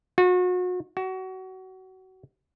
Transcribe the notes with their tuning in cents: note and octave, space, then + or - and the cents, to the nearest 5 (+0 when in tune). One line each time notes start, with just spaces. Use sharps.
F#4 -35
F#4 +25